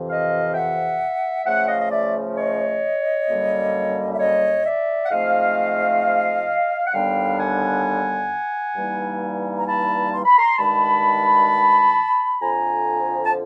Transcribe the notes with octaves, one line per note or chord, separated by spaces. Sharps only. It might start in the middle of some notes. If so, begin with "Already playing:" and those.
Already playing: F2 C3 E3
D#5 F5
G5
E5 F#5
C#3 F3 A3 E5 F#5
D#5 F5
D#5
D5 E5
C#5 D#5
F#2 D3 G3 A#3
E5
C#5 D#5
D5 E5
F#5
G#2 F3 A3 C4 D#5 F5
F#5
D#2 D3 G3 B3 D4 F5 G5
F#5 G#5
G2 E3 G3 A#3 D#4
A#5
A5 B5
C6
B5
A#5 C6
G2 D#3 G#3 A5 B5
F2 D3 F3 G#5 A#5
A5